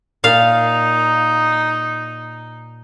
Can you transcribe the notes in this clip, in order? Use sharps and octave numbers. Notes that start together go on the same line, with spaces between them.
A#2 D#4 F5